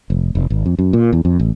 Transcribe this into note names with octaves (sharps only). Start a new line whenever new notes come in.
F1
F1
G#1
F2
F#2
A#2
E2
F2
A1